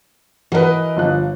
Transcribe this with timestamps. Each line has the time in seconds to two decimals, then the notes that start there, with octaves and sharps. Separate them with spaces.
0.52 E3 F#4 A#4 B4 D#5
0.97 G1 F3 F#6